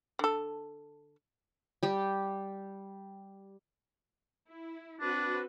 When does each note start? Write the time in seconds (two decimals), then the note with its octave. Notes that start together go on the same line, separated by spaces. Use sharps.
0.19 D3 A4
1.83 G3 G4
4.48 E4
5.01 C4 D4 F#4 B4